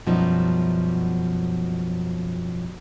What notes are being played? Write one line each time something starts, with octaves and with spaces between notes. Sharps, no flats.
F#2 B2 F3 G3 D#4